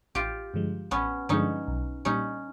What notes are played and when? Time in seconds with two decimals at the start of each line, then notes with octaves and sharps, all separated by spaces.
0.15 A1 F4 G4
0.54 G2 D3 F3 G#3
0.91 A1 B3 C#4
1.29 G2 D3 F3 G#3 C#4 D#4
1.67 B1
2.05 A#2 G3 C#4 D#4